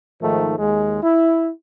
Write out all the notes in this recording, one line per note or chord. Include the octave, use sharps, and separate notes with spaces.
G#2 D#3 F3 A3
D#2 G#3
E4